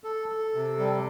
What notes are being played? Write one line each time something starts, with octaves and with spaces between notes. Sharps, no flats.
A4
A4
C3
G3